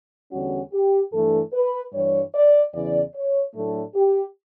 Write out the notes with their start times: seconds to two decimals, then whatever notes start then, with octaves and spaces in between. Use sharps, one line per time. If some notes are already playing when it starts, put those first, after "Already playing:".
0.32 E2 D3 G3 C#4 F#4
0.73 G4
1.12 G2 E3 A3 D4 A4
1.53 B4
1.93 G2 E3 G3 C#5
2.34 D5
2.73 E2 C#3 E3 D5
3.14 C#5
3.55 A2 F#3 A3 D4 A4
3.95 G4